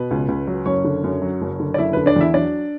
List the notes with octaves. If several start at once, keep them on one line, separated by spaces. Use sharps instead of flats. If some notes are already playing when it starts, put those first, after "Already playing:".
Already playing: B2 B4
C#2
C#2
F#3
F#1 C#4 C#5
D3
F#2
F#3
F#1
D3
D5
F#1 E4 E5
D3 B4
D4 D5
E2 E4 E5
F#3 D4 D5